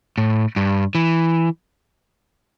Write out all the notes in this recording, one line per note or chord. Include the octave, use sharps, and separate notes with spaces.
A2
G2
E3